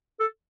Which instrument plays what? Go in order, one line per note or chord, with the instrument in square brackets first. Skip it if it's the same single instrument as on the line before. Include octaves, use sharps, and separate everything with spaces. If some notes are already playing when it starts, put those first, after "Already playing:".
[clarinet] A4